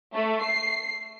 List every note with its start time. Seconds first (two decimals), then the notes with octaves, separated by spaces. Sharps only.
0.13 A3
0.43 C7